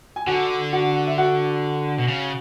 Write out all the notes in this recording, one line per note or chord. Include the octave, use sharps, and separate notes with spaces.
G#5
D3 F#4 F#5
F#4 F#5
E5
F#4 F#5
B2
C#3